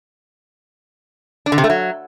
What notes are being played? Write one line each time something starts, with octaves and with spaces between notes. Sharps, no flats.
D4
D3
C3
A3
F#3